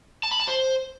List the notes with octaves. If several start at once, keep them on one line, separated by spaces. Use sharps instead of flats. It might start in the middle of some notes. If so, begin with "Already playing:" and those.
A5
B5
A5
C5